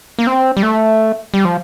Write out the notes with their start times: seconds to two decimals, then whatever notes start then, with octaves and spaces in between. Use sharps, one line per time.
0.19 A#3
0.27 C4
0.57 G3
0.63 A3
1.34 G3
1.45 F3